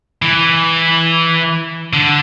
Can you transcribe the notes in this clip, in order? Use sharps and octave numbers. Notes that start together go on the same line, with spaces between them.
E3
D3